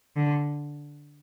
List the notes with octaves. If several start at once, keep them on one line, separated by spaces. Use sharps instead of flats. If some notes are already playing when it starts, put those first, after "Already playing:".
D3